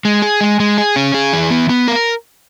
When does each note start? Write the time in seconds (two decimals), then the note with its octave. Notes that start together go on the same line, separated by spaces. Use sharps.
0.05 G#3
0.22 G#4
0.41 G#3
0.60 G#3
0.78 G#4
0.96 C#4
1.14 G#4
1.33 E3
1.50 B3
1.69 B3
1.88 A#4